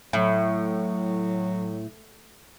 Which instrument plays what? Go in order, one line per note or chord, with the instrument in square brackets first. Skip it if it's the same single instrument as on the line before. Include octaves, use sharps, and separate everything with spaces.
[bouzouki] A2 [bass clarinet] F#3